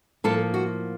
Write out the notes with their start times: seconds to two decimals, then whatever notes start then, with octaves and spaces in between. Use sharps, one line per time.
0.24 A2 F3 A#3 A4
0.54 F#4